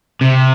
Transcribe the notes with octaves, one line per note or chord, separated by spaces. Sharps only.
C3